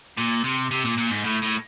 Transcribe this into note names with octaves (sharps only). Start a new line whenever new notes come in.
A#2
C3
C3
A#2
A#2
G#2
A2
A2